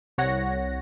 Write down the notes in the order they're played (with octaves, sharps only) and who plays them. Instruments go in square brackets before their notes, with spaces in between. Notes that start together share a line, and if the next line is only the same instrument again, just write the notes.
[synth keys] C2 C#5 F#5 A#6